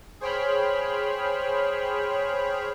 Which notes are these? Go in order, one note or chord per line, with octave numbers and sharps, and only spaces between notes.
G#4 C5 C#5 G5 B5 F6